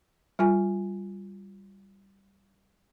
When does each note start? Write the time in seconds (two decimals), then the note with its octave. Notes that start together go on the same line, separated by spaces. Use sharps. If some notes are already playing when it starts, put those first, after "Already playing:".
0.39 G3 F4 G#5